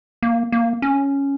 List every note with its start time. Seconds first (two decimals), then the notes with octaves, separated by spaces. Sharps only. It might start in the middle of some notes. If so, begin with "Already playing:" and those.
0.23 A#3
0.52 A#3
0.82 C#4